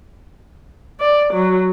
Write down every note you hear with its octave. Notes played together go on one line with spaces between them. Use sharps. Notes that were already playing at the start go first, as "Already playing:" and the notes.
D5
F#3